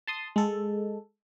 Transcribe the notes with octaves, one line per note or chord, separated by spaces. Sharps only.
A5 C6 D#6
G#3 A4